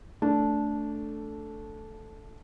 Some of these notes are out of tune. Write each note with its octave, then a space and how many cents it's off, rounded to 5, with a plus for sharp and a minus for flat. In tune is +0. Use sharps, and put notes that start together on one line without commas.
A3 +0 D4 -15